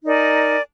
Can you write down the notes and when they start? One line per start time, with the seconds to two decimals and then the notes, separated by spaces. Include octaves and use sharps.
0.04 D#4 A#4 D5 G#5